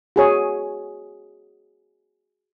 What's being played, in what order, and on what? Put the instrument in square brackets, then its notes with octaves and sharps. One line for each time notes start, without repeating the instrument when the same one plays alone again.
[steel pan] F#4 G#4 C#5